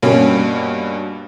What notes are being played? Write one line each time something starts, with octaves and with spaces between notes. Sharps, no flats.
G2 B2 A#3 C#4